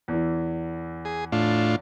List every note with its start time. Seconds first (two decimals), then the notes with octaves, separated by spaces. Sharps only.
0.08 E2 E3
1.05 G#4
1.32 A2 D4 F4